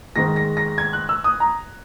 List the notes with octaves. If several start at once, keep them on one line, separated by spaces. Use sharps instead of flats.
G#2 D#3 G#3 A#6
A#6
A#6
G#6
F#6
E6
D#6
A#5